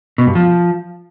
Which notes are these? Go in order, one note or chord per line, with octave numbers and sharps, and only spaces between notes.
B2
G2
F3